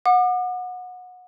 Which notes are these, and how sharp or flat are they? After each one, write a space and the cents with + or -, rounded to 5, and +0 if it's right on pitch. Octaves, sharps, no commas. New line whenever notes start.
F#5 -25 D6 +40